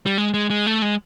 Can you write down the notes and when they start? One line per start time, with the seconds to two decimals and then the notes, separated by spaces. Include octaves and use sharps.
0.06 G3
0.18 G#3
0.34 G#3
0.50 G#3
0.67 A3
0.82 G#3